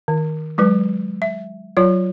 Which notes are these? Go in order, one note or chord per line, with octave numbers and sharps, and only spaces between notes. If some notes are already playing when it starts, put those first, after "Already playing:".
D#3
F#3 G#3 B4
E5
F#3 F4 C#5